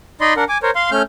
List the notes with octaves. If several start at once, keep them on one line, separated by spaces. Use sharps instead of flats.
D#4 D5 D#5 B5 C6
D4 A#4 F#5
G#5 D6
A#4 C5 C#5
F5 C6
A3 C#4 F6 G6